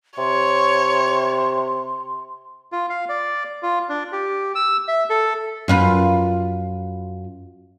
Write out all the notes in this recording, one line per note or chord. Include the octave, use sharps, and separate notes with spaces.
C3 C#5 C6
F4
F5
D5
F4
D4
G4
E6
E5
A4
F#2 F4 B4